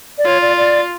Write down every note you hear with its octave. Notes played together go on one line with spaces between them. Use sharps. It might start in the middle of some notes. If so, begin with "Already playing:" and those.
D5
F4 C#5
D5
D5